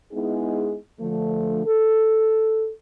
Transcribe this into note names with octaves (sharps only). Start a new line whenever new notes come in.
G#3 B3 D#4 E4 G#4
D3 F3 A3
A4